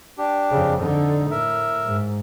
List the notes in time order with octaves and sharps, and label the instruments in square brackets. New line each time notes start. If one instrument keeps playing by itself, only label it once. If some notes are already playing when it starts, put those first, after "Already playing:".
[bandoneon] D4 G4
[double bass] F2 C#3
[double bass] D3 [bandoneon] D#4
[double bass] A2 [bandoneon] A#4 E5
[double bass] G#2